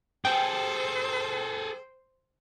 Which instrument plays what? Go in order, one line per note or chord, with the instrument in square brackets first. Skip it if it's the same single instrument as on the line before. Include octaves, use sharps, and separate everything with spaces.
[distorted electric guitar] G#4 A4 [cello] C5 [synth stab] G5